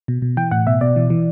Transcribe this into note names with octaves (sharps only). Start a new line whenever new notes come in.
B2
B2
E3 G5
A2 F#5
B2 E5
B2 D5
E3
E3